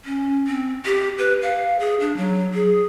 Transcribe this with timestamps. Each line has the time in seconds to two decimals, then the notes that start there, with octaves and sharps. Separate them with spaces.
0.05 C#4
0.47 C4
0.86 G4
1.18 B4
1.42 F5
1.80 G#4
2.00 D4
2.17 F#3
2.54 G#4